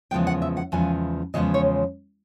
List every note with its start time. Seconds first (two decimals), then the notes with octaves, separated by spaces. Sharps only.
0.11 E2 C#3 F3 G#3 B3 G5
0.27 F#5
0.42 E5
0.57 F#5
0.72 E2 C#3 F3 G#3 B3 G#5
1.34 E2 C#3 F3 G#3 B3 D#5
1.54 C#5